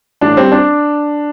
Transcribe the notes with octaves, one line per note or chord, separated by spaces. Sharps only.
A1 D4
G3 C4
D4